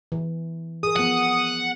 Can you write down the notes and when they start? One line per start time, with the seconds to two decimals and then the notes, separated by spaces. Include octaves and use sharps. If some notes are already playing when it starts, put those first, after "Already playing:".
0.12 E3
0.83 G#4 A#4 D#6
0.96 F3 B3 F#5